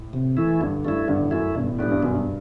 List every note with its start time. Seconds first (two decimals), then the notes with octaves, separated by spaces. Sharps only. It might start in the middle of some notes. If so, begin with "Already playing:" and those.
Already playing: A2
0.13 C3
0.37 E3 A3 E4
0.61 G2 D3
0.85 G2 A3 E4
1.08 G2 D3
1.16 A2
1.23 G2
1.31 F#2 A3 E4
1.55 G2 B2
1.67 A2
1.79 A2 G3 B3 D4
1.90 G2
2.02 F#2 B2
2.13 G2